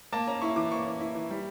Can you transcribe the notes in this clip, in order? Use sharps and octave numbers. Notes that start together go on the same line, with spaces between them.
A#3 A5
C#4 A#5
E4 C#6
E3 D6
A#3 C#6
C#4
E4
E3
G3